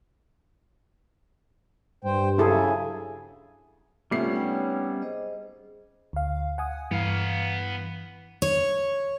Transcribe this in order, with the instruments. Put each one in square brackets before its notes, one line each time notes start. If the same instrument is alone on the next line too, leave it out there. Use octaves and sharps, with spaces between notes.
[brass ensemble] G2 [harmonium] C5 G5
[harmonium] C#3 F#3 [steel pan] E4 G#4 A4 [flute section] E5 G#5
[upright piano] C3 A3 C7 [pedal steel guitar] G3 B3 C#4 [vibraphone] F4
[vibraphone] D#4 C#5 G5
G#4 C5 D#5
[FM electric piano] D2 F5
F#5 G#5 D#6
[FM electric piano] G2 E3 [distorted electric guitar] B3 F5
[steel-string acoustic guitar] C#5